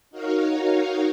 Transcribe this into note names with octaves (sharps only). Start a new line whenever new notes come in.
D#4 F#4 A#4 C#5 F5